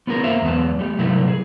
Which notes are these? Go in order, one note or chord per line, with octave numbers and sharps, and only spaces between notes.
B3 C#4 F4 G#4 A#4
A#3 A#4 C5 E5 F5 A#5
E2 F#3 G#3 B3 A5
G3 A3 G4
C3 F#3 G3 A3 E4 A#4
G#4